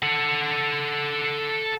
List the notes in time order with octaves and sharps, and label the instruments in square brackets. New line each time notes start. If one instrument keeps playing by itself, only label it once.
[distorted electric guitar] A4 F#5